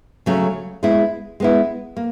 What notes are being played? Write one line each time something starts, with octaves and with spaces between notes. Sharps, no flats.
C#3 F#3 A3 C#4
G#3 B3 E4
G#3 B3 E4
A#3